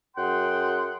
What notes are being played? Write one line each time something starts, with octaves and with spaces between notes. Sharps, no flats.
F#2 G#4 F#5 G5 C6